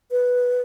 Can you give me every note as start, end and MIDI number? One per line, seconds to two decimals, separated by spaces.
0.11 0.61 71